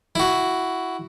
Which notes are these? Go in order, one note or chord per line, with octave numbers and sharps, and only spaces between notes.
E4 F#4